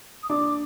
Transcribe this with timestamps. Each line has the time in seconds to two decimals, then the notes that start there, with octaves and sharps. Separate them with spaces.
0.23 D#6
0.29 D4 D6